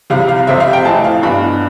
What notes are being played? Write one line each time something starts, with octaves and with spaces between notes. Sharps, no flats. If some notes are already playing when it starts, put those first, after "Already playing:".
C2 C3 G3 F5
F5
F2 C3 G3 C4 E5
F5
G5
A1 A2 E3 A5
F5
G2 E3 B3 D4 B5